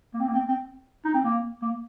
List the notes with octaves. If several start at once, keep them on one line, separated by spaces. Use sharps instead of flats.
A#3
C4
A#3
C4
C4
D#4
C4
A#3
A#3